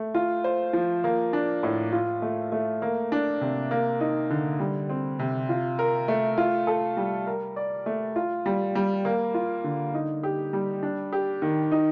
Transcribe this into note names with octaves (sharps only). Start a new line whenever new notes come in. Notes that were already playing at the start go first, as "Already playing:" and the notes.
Already playing: A3
F4
C5
F3
A#3
D4
A2
F4
A3
A3
A#3
D4
C3
A#3
D#4
D3
G3
C4
C3
F4
A#4
A3
F4
A4
G3
A#4
D5
A3
F4
G3
G3
A#3
F4
D3
D#4
G4
G3
D4
G4
D#3
D#4